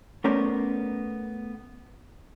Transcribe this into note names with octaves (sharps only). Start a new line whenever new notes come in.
A3 B3 C#4 A#4 C5 D5